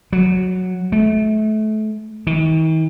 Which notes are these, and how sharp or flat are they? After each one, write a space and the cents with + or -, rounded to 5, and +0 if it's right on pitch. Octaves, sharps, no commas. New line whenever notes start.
F#3 -5
A3 -30
D#3 +45